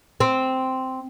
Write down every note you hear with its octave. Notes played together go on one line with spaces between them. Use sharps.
C4